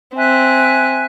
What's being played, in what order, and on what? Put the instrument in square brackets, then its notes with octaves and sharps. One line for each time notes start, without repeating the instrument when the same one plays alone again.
[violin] C4 [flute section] E5 G#5 F#6